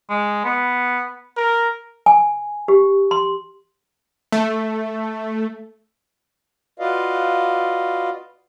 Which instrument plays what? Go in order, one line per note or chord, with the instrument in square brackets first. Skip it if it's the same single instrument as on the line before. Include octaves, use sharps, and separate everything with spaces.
[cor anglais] G#3
B3
[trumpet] A#4
[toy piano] G#5
G4
C6
[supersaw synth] A3
[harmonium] F4 F#4 B4 D5 D#5 F5